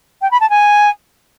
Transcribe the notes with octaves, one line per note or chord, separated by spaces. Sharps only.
G5
B5
A5
G#5